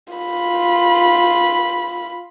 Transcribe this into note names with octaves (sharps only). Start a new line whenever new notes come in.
F4 B5